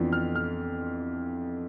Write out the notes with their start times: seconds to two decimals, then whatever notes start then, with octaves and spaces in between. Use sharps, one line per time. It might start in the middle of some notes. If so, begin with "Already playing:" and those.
Already playing: F2 E3 B3 D4 F4
0.13 F6
0.35 F6